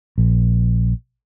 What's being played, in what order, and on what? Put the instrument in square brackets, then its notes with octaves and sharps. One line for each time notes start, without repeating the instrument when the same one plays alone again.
[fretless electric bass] A#1